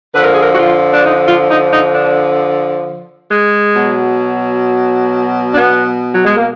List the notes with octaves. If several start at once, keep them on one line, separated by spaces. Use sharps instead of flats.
D3 F3 B4
A#4
G#4
A#4
F#4
F4
D4
D#4
F4
D#4
D#4
D4
G#3
B2 F#3
D4
B3
F#3
G#3
A#3